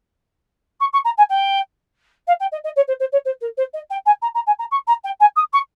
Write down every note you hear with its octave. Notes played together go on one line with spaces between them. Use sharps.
C#6
C#6
A#5
G#5
G5
F5
G5
D#5
D#5
C#5
C5
C5
C#5
C5
A#4
C5
D#5
G5
G#5
A#5
A#5
G#5
A#5
C#6
A#5
G5
G#5
D#6
C#6